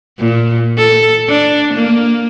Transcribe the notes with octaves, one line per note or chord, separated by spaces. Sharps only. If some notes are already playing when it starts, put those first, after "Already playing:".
A#2
A4
D4
A#3